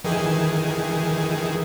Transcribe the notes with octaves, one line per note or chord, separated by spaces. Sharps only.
D#3 E3 G#4